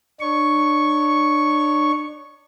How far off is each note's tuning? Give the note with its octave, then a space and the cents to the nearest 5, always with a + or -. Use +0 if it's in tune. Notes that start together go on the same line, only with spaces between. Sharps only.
D4 +35 C#5 +20 C#6 +0